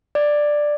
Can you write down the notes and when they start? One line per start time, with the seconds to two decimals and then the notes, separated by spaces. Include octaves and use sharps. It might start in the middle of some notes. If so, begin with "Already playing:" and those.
0.15 D5